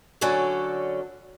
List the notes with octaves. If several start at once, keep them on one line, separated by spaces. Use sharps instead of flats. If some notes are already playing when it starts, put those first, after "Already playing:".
D3 F#3 C#4 A4 D5